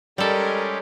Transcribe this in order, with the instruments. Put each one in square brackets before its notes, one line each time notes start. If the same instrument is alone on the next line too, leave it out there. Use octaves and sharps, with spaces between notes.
[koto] G3 A4 [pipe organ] G#3 C#4 G4 [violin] A#4 D#5